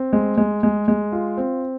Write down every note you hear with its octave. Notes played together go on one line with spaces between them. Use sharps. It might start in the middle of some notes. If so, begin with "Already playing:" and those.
Already playing: C4
G#3
G#3
G#3
G#3
F4
C4